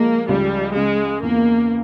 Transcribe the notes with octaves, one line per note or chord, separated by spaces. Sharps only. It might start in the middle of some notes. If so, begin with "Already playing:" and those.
Already playing: F3 G#3 A#3
C#2 G3
C#3 G#3
E2 A#3